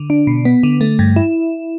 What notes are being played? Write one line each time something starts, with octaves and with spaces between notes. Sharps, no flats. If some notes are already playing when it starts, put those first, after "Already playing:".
Already playing: D3
D4
B2
B3
D3
A3
G2
E4